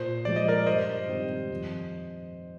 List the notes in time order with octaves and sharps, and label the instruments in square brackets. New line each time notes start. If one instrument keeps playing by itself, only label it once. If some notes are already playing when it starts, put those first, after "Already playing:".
Already playing: [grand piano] A#2 [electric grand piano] C5
[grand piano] F3 G#3 [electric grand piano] D5
[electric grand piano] D#5
A#4 D5
[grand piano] G2 [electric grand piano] C5 D#5
[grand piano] D#3 G3 C4 G4
F2